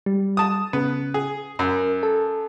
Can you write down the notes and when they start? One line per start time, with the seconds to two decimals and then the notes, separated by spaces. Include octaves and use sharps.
0.06 G3
0.37 A5 D#6
0.73 C#3 B3
1.14 G#4
1.59 F#2 A#4
2.03 A4